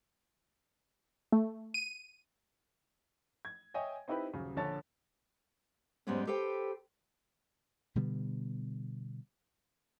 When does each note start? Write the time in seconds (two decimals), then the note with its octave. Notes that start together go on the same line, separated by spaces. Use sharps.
1.32 A3
1.74 D#7
3.45 G#6
3.74 C#5 D#5 E5 G5 G#5
4.08 C4 D#4 E4 G4 B4
4.33 D#1 C#3 F#3
4.56 A#1 D3 C#5 A5 A6
6.07 F2 G#2 G3 G#3 B3 C#4
6.27 G4 A4 B4 C5 G5
7.95 B2 D3 G3 B3